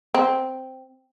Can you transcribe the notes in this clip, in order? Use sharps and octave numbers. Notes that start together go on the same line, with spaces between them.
C4